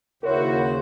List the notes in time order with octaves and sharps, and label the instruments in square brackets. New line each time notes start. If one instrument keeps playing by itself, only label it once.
[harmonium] D#2 C#3 C5 [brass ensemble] E4 F#4 [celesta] A#4 C#5